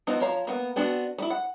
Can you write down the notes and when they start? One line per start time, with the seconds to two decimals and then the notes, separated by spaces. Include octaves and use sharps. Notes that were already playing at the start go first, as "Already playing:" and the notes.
0.07 F3 B3 C4 D#4
0.20 F3 C#5 F5 A#5
0.47 A#3 B3
0.76 B3 C4 D4 F#4
1.18 G3 E4
1.30 F#5